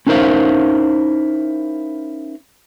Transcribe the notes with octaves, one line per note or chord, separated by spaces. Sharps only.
C#4 D#4 E4 A#4 C5 F5